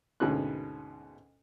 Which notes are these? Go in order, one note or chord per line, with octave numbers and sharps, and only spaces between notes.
D2 G#2 B2 C#4 F#6